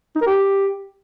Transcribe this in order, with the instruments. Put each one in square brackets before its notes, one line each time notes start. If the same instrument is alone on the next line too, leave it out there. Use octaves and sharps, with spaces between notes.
[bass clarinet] D#4
A#4
G4